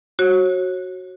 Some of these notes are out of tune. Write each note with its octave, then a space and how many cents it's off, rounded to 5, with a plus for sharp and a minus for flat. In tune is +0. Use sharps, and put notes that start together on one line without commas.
F#4 +0 C#5 -35